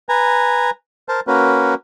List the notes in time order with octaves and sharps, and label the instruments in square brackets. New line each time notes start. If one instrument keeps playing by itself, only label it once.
[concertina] B4 G#5 A#5
A#4 C5 A5
A#3 C#4 F#4 A#4 B4